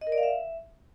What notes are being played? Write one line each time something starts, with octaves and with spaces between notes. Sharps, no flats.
D#5
A#4
D5
F5
E5